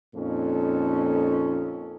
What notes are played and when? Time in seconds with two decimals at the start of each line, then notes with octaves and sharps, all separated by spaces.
0.15 F2 A#2 C#4 D#4 A4